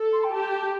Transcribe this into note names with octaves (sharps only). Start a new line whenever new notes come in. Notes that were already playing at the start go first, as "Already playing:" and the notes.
Already playing: A4
C6
G5
G4 A5